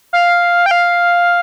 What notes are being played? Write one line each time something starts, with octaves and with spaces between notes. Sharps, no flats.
F5
G5
F5